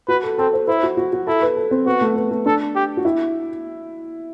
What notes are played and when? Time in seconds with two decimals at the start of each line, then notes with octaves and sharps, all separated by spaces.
0.08 F#4 B4
0.23 A4
0.38 C4 A4
0.53 C5
0.68 E4 C5
0.83 F#4
0.97 F#4
1.13 F#4
1.27 E4 A4
1.42 B4
1.56 A4
1.71 C4
1.86 B3 F#4
2.01 A3
2.16 B3
2.31 A3
2.46 D4 A4
2.75 G4
2.97 F#4
3.05 E4